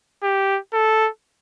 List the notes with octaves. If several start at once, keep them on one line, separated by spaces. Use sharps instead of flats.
G4
A4